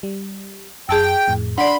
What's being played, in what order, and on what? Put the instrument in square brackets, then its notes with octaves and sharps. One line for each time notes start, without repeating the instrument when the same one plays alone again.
[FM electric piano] G3
[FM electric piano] F#2 [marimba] G#4 A5 E6 [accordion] G5
[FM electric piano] F2 A2
[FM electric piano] D4 [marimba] D5 F#5 [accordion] B5 C6